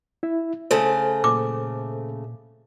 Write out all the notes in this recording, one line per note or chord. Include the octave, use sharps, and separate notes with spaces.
E4 E5
C#3 A3 A4 C5
A#2 D6